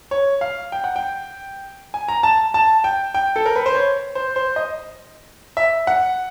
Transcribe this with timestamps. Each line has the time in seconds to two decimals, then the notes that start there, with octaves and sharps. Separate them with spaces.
0.11 C#5
0.41 F5
0.72 G5
0.84 F#5
0.96 G5
1.94 G#5
2.08 A#5
2.23 A5
2.54 A5
2.84 G5
3.14 G5
3.36 A4
3.46 A#4
3.56 B4
3.66 C5
3.75 C#5
4.15 C5
4.36 C5
4.56 D#5
5.57 E5
5.87 F#5